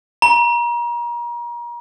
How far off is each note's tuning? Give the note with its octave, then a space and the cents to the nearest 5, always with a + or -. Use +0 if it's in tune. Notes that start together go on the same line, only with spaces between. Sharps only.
A#5 +35